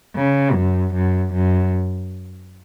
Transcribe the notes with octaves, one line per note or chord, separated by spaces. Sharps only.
C#3
F#2
F#2
F#2